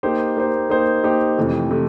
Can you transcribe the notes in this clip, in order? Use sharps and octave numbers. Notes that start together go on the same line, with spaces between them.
A#3 D#4 G4 C5
A#3 D#4 G4 C5
A#3 D#4 G4 C5
A#3 D#4 G4 C5
F2 C3 E3 A3
C3 E3 A3